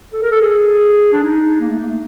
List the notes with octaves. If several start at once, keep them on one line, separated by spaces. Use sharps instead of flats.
A4
A#4
A4
G#4
D4
D#4
A#3
A3
A#3
A3